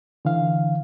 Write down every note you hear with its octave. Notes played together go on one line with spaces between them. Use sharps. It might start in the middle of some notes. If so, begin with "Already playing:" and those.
D3 E3 F5